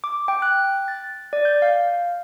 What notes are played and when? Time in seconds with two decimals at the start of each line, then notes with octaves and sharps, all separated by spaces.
0.04 D6
0.28 G5
0.42 F#6
0.88 A6
1.33 D5
1.45 G6
1.62 F5